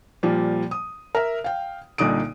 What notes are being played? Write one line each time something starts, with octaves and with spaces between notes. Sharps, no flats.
A#2 F3 G3
D#6
A#4 E5
F5 G5
C2 A#2 D3 D#4 D#6 D7